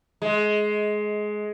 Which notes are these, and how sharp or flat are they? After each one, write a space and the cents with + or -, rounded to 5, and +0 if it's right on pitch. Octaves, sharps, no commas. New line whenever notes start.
G#3 +15